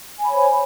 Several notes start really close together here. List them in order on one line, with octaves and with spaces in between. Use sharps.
G#5 B5 C#5 C5